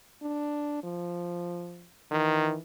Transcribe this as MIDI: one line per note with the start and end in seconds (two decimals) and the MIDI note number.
0.23 0.82 62
0.84 1.88 53
2.11 2.56 51
2.11 2.62 52